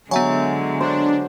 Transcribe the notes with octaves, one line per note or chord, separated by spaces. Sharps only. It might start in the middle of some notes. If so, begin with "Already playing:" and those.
D3 F#3 G#3 B3 E5 G#5
D4 C5